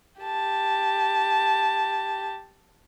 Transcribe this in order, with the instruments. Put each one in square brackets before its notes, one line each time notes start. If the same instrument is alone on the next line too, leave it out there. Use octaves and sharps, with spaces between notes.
[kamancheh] G4 A5